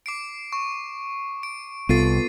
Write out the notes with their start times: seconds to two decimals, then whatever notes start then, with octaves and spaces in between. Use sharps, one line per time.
0.06 D6 C7 D7
0.53 C#6
1.43 D7
1.89 C2 B3 F4 A4 A6 C7 D#7